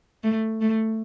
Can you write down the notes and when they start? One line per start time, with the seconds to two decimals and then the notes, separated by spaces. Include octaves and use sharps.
0.23 A3
0.61 A3